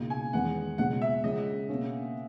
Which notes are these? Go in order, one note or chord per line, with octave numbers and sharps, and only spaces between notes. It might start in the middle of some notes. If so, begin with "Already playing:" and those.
Already playing: C#2 B2 A#3 D#4 F#4
G#5
E2 D#3 G#3 B3 F#5
C#2 B2 G#3 C#4 F#4 F#5
E5
C#2 C#3 G#3 D#5
B2 A#3 C#4 G#4